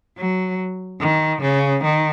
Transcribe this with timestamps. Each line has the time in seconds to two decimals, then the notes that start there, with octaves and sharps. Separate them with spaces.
0.16 F#3
1.00 D#3
1.42 C#3
1.83 D#3